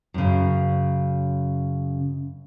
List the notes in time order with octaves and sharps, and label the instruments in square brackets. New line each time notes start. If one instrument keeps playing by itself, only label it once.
[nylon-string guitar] F#2 C#3